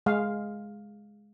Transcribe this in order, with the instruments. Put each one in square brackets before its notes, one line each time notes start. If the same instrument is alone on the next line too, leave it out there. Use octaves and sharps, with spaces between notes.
[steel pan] G#3 F5